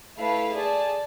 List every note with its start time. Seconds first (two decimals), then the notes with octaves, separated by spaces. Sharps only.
0.18 A3 E4 B4 F5
0.54 G#4 D5 A5